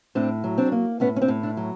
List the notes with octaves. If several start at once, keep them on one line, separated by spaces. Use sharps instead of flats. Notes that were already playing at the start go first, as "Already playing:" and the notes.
A2 C4 D4
F#3
C4 D4
A#3
A2 B3 C#4
C#4
C4 D4
A2
D4 E4
F#3